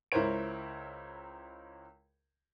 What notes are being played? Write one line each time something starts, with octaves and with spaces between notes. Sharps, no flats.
C#2 E4 A#4 C5 C#5 D7